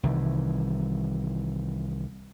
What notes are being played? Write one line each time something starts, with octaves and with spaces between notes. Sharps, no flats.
C2 D#3 E3